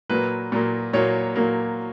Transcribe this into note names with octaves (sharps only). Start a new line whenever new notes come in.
A#2 F#3 A#3 B4
A#2 F#3 A#3
A#2 F#3 A#3 C#5
A#2 F#3 A#3